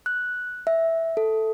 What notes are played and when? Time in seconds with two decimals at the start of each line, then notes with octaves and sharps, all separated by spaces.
0.06 F#6
0.67 E5
1.17 A4